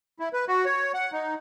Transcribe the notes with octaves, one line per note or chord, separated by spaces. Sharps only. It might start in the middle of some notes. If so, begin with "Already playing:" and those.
E4
B4
F#4
C#5
F#5
D#4